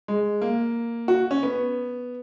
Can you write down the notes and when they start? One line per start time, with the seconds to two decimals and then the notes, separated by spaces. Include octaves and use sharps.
0.08 G#3
0.42 A#3
1.08 F#4
1.31 C#4
1.43 B3